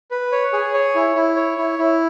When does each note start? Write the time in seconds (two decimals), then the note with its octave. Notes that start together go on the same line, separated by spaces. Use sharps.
0.11 B4
0.32 C#5
0.53 G#4
0.74 C#5
0.95 E4
1.16 E4
1.36 C#5
1.58 E4
1.79 E4